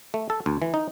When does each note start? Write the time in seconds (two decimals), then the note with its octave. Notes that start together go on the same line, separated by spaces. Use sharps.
0.14 A3
0.30 A4
0.46 D2
0.62 E3
0.74 D#4